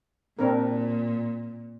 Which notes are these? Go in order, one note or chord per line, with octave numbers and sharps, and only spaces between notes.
A#2 C4 D4 A#4